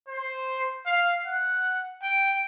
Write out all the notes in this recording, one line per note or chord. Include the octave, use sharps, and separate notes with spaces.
C5
F5
F#5
G5